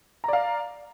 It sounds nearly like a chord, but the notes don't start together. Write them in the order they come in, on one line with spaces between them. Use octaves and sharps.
A#5 D5 F5